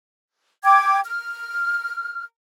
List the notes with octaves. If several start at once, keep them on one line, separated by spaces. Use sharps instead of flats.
G5 D6 G#6
F6